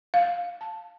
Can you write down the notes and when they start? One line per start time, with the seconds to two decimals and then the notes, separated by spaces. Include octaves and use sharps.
0.14 F5
0.61 A5